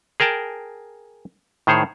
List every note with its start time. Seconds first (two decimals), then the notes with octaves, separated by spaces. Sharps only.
0.20 G#4 A#4 G5 A5
1.67 A2 D#3 G#4 C5 C#5